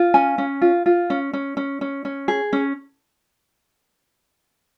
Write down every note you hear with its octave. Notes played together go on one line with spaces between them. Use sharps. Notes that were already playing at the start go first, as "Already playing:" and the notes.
Already playing: F4
C#4 G#5
C#4
F4
F4
C#4
C#4
C#4
C#4
C#4
G#4
C#4